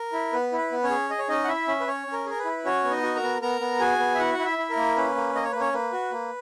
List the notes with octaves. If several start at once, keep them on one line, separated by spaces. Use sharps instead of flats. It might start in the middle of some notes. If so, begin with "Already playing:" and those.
Already playing: A#4
E4
B3 B4
E4
B4
B3
C#4 C#5
G#4
G#4 D#5
C#5
C#4 D#4 D#5
F#5
E4 E5
C#4
B4
C#4 C#5
C#4
A#4
G#4 A#4
B4
E4
C#4 F#4 C#5
B3
D#4 D#5
F#4
A#4 A#5
B3
B3 A#4 A#5
B3
F#4 G#4 G#5
B3
E5
E4 F#4 F#5
E4 F#5
E4 E5
E4
A#4
A#3
C#4 B4
A#3
A#3 D#5
C#5
A#3 B4
C#4 C#5
A#3 B4
F#4
A#3